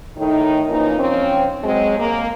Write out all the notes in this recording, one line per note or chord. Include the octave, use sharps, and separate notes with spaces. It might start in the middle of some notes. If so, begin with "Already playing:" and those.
A2 D#3 D#4
E3 F3 A#3 C#4 D#4
F3 C4 C#4
F#3 G#3 C4
A#3